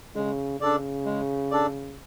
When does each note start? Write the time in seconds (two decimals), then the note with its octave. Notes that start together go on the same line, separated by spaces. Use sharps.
0.15 C#3 G#3
0.60 C#3 D4 A4 D5
1.05 G#3
1.51 D4 A4 D5